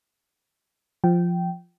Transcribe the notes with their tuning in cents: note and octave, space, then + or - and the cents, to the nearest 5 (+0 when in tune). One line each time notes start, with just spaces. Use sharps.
F3 +0 G5 -15